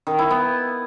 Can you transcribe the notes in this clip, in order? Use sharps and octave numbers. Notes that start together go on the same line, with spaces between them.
D#3
E4
B3